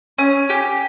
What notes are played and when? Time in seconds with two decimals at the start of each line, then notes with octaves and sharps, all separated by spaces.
0.18 C#4
0.49 G4